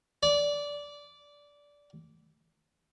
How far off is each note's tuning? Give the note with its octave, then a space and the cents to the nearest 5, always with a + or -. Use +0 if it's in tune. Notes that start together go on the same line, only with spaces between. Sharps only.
D5 -15